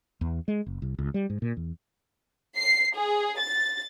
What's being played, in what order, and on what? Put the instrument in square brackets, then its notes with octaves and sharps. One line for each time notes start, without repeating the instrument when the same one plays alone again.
[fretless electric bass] E2
G#3
F#1
C2
C#2
G3
G#2
A#2
E2
[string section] C7
G#4
A6